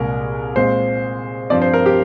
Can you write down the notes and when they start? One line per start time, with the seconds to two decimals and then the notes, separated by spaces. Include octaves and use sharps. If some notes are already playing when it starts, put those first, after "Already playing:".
Already playing: C2 A#2 G#3 A#4
0.56 A#2 G#3 C4 C5
1.50 G2 F3 C4 D5
1.62 C5
1.74 A#4
1.86 G4